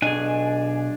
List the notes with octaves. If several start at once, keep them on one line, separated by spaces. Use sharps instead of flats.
B1 D4 G#4 D#5 G#5